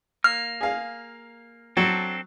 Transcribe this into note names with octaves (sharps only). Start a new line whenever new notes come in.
A#3 F6
G#4 F5
F#3 C4 D4 A4